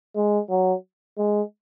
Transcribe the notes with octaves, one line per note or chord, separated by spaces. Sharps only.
G#3
F#3
G#3